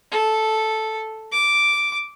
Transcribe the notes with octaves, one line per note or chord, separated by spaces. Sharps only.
A4
D6